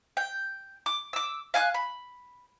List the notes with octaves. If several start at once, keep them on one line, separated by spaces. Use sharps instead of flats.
G5
D6
D6 E6
F5 G#5 F6 F#6
B5